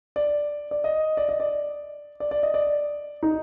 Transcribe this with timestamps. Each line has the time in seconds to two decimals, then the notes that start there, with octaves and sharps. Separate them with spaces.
0.16 D5
0.71 D5
0.84 D#5
1.17 D5
1.29 D#5
1.40 D5
2.20 D5
2.31 D5
2.43 D#5
2.54 D5
3.23 D#4